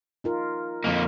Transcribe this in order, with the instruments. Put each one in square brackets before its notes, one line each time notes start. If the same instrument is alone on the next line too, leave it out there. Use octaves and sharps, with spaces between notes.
[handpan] D#4 F4 A#4
[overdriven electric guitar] F2 A#3 [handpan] D#5